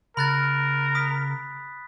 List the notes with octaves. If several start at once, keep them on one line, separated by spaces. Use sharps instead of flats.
C#3 A#4 B5 F#6 A6
D#6 B6